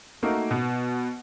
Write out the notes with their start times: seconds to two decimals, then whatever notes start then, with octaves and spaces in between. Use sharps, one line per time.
0.23 A3 A#3 D#4 F#4 A#4
0.51 B2 B3